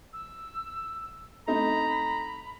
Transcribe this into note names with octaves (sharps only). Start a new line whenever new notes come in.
E6
A3 C4 D#4 A#5 B5